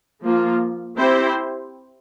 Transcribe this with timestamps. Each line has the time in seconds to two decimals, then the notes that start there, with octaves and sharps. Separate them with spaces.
0.23 F3 A#3 F4
0.97 C4 E4 G4 C5